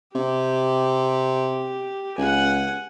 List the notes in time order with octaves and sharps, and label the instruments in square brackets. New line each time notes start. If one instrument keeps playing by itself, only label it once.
[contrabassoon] C3 [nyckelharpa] G4
[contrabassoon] C#2 [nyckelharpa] F#5 G#5